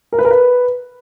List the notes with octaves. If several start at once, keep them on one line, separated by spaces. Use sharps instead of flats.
A#4
B4
A#4
B4